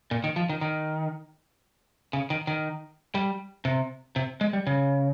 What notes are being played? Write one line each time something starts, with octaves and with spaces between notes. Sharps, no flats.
A#2
D#3
F3
D#3
D#3
C#3
D#3
D#3
G3
C3
C3
G#3
G3
C#3